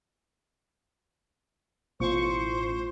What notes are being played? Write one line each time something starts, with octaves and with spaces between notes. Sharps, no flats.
A1 B2 F4 C5 C#6